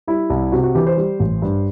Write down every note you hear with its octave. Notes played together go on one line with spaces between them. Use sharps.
G3 E4
C2
C3 F#4
F#4
E3 G4
C5
G3
A1
G2